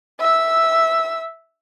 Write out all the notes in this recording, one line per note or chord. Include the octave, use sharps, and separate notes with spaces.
E5 E6